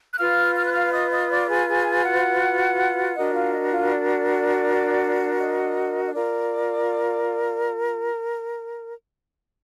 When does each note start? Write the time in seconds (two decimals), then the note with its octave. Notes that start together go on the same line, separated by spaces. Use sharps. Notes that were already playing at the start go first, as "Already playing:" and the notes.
0.13 F#6
0.19 F4 B4 F5 F6
0.56 F6
0.65 F#6
0.74 F5 F6
0.93 D#5 D#6
1.11 D#5 D#6
1.31 D5 D6
1.49 G#4 G#5
1.67 G#4 G#5
2.05 F#4 F#5
3.16 D4 F#4 A#4 D#5
3.35 F4 F5
3.54 D#5
3.72 F4 F5
3.91 D5
5.40 D#5
6.05 D#5
6.14 F4 A#4 D5